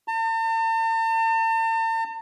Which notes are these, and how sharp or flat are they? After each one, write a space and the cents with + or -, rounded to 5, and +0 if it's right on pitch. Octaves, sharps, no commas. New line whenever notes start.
A5 +45